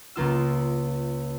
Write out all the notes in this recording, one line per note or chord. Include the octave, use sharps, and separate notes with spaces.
C#2 A#3 F4 E6